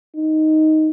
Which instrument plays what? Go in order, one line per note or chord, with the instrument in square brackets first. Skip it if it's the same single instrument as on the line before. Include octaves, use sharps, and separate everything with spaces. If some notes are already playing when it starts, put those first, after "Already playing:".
[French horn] D#4